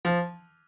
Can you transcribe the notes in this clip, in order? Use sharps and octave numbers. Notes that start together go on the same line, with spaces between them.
F3